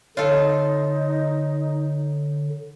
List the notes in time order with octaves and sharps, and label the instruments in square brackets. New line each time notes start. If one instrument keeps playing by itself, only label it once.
[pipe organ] D3 [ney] D#4 [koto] F4 A4 [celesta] C#5